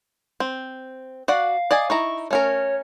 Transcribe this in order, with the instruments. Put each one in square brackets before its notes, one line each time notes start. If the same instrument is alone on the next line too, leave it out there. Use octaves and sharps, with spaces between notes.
[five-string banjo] C4
[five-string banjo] F#4 D5 F#5 [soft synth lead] F5
[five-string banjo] D5 D#5 G#5
[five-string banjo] D#4 E4 A#5 [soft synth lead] C#6
[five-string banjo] A3 C#4 A#4 [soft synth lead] C#5